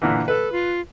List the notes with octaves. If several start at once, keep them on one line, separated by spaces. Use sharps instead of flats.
A#2 D3 E3
A4 B4
F4